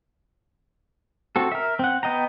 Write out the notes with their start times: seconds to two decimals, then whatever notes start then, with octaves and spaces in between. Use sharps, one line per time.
1.36 C4 F#4 A4
1.52 A#4 E5
1.79 C4 F#5
2.03 B3 D#5 G5 A#5